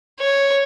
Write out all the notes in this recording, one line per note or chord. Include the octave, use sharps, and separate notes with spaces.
C#5